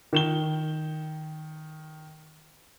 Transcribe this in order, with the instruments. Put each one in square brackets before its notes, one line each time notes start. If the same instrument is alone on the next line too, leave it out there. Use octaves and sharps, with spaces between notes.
[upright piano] D#3 E7 G7